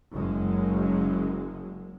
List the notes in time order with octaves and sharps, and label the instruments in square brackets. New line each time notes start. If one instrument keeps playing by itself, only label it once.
[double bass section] F#1 F#2 G#3